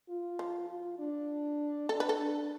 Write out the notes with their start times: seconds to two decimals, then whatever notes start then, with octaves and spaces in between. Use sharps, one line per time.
0.09 F4
0.39 F3
0.69 F4
0.99 D4
1.89 D4 A4
2.00 B4
2.09 A4
2.20 D4